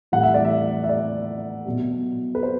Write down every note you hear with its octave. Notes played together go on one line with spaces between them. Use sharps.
A2 E3 G3 F#5
E5
D5
E5
E5
D5
B2 F#3
B4
C5